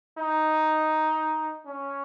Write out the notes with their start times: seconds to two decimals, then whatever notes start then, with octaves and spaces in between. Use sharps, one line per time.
0.18 D#4
1.66 C#4